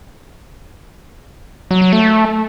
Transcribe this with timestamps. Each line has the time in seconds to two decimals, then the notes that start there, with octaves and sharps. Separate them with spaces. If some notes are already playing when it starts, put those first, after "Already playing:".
1.71 F#3
1.82 F#3
1.93 A3